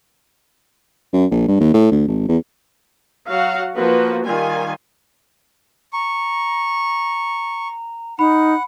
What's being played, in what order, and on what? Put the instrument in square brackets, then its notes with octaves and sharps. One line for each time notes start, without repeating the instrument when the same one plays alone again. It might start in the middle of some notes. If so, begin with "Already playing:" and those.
[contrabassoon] F#2
A#1
G2
D#2
A2
D2
G#1
E2
[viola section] F#3 F#4 F5 F#5
F3 A#3 F#4 B4
D#3 G3 F4 G#5
[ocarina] A#5 [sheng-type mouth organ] C#6
[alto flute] D#4 [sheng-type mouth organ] F#5 [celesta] B5